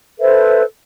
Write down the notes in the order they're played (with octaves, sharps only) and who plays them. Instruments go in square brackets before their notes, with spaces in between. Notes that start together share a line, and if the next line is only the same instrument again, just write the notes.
[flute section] A4 B4 C5 E5